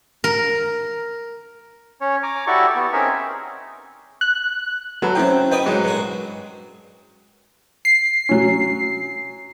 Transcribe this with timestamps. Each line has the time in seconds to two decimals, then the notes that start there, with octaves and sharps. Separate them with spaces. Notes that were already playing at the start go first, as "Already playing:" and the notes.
0.24 A#4
2.01 C#4 C#5
2.23 G#5 A#5 D6
2.47 E4 F#4 G4 A4 D5 C#6
2.75 B3 G4
2.93 C4 C#4 D#4 G#4 A#4 E5
4.21 F#6
5.02 F#3 F#4 A4 B4
5.15 C4 C#4 E4 F4 G5
5.51 B3 C#4 B4 D#5 G5
5.66 G#2 F#3
5.84 G2 A#2 F#4
7.85 C7
8.29 F#3 C#4